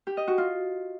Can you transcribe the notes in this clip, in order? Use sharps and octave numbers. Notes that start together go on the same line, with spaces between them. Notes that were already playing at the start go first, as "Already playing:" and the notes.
G4
D#5
F#4
F4